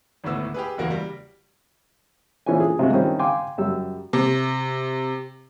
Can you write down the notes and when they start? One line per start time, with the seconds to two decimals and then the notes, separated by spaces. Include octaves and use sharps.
0.24 G#1 D2 A2 B3 E6
0.54 G4 G#4 B4
0.77 F#1 E2 A#3 F#4 A#6
0.90 G3
2.46 A#2 E3 F3 C#4 D4 G#5
2.60 G#4
2.79 C3 F#3 G#3 F4 F#4
2.93 D#3 G3 C4 C#4 E4
3.19 F5 G5 G#5 C6 D6
3.58 F#2 G3 E6
4.13 C3